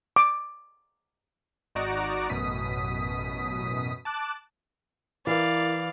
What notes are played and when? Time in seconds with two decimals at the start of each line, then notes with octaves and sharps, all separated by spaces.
0.16 D6
1.75 G#1 D#4 F#4 D5 A#5 D7
2.30 A1 F#2 B2 D#6 B6
4.05 A5 D6 F#6
5.27 E3 E4 A#4 D5 F5